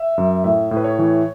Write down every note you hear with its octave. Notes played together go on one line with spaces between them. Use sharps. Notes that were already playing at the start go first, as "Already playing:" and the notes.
Already playing: E5
F#2
A2 E5
A2
B4
C#5
E3